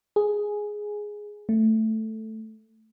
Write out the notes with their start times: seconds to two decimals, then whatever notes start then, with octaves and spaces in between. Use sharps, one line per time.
0.16 G#4
1.49 A3